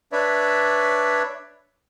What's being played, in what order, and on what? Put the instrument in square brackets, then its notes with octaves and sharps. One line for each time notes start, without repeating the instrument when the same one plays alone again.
[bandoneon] D4 B4 C#5 D5 E5